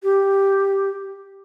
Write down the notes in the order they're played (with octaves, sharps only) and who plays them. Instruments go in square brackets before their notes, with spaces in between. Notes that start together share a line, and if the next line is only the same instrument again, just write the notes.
[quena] G4